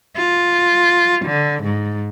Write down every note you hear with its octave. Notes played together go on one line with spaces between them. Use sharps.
F4
D3
G#2